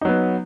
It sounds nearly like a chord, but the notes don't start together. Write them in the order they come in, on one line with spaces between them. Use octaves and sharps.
D#4 F#3 B3